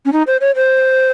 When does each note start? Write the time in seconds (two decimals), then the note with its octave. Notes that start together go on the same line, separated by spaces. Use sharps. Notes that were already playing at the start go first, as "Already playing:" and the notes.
0.05 C#4
0.12 D#4
0.27 C5
0.41 C#5
0.55 C5